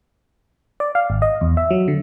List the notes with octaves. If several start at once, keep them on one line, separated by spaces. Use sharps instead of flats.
D5
F5
G#1
D#5
E2
E5
F#3
D3